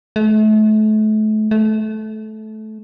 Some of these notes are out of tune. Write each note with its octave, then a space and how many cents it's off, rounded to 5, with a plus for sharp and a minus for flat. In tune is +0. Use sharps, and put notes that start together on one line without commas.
A3 -35
A3 -20